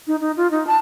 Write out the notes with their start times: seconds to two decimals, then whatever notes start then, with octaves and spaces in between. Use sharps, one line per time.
0.07 D#4
0.21 D#4
0.37 F4
0.51 D#4
0.67 A5